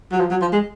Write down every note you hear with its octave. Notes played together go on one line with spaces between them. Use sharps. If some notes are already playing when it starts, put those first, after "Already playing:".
F#3
F3
F#3
F3
G#3